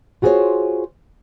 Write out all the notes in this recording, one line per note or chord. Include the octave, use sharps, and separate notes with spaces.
F4 F#4 G#4 A4 C5 C#5